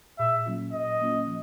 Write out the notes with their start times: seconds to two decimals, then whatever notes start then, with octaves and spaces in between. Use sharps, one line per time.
0.19 A#2 E5
0.46 F#3 A#3 C#4 F4
0.73 A#2 D#5
1.00 F#3 A#3 C#4 F4
1.27 F3